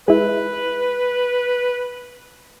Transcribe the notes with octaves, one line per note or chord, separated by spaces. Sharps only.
G#3 E4 B4